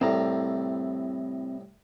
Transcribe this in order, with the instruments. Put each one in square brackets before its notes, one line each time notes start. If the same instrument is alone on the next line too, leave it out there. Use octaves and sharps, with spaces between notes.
[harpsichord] C2 A2 [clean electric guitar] C4 A#5